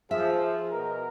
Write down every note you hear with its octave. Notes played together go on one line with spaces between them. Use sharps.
F3 G#4 E5
B2 A#4